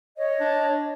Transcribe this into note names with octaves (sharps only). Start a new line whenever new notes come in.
C#5 D#5
D4